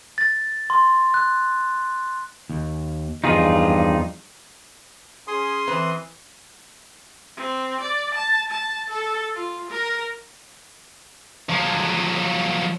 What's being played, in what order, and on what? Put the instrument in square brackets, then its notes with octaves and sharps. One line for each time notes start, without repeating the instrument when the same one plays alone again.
[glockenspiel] A6
C6
F#6
[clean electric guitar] D#2
[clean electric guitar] E2 F3 [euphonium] G2 [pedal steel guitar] D#4 F4 G#4
[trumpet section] C#4 G#4 [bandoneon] C6 D#6
[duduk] E3 [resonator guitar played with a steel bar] C4 B4
[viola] C4
D5
A5
A5
A4
F4
A#4
[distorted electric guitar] F3 F#3